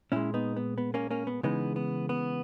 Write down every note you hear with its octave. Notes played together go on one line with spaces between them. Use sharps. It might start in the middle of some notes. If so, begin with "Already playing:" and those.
A#2 G#3 C#4 E4
B3 D#4
B3
B3
A#3 C#4
A#3 C#4
B3
C#3 E3 G#3 B3 D#4
B3
B3